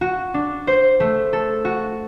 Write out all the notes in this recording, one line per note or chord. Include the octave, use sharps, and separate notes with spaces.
F#4
D4
C5
A3
A4
F#4